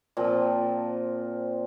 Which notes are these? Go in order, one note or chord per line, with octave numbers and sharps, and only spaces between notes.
A#2 F3 C4